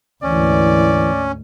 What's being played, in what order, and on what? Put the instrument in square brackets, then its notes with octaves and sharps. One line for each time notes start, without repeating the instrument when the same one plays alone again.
[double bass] D2 G#2 [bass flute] E3 [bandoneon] C#4 [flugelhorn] D5